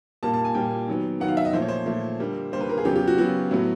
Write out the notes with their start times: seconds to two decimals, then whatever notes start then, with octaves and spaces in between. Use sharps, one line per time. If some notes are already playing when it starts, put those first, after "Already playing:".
0.23 A#2 G3 A#3 A5
0.34 A5
0.45 G#5
0.55 A#2 G3 A#3 G5
0.88 D#3 F#3 B3
1.20 D#3 F#3 B3 F#5
1.28 F5
1.37 E5
1.45 D#5
1.53 A#2 F3 A3 C5
1.62 C#5
1.68 C5
1.86 A#2 F3 A3
2.20 D3 G3 A#3
2.52 D3 G3 A#3 C5
2.61 B4
2.69 A#4
2.78 G#4
2.85 C#3 F#3 B3 G4
2.96 G4
3.07 F#4
3.18 C#3 F#3 B3 F#4
3.51 A2 F#3 B3